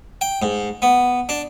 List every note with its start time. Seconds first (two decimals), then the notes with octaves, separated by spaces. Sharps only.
0.21 G5
0.42 G#2
0.82 B3
1.29 D4